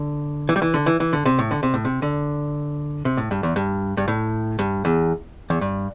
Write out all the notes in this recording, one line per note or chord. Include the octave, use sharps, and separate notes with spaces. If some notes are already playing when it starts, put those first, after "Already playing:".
Already playing: D3
E3
G3
E3
D3
E3
E3
D3
C3
A2
D3
C3
A2
C3
D3
C3
A2
G2
E2
G2
G2
A2
G2
E2
E2
G2